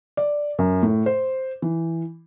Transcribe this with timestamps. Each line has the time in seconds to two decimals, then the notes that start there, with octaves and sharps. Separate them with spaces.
0.17 D5
0.59 F#2
0.83 A2
1.06 C5
1.62 E3